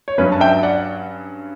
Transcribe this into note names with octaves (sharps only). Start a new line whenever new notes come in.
C#5
G2 F#3 C#4 B4
A5
E5 G5
D5 F#5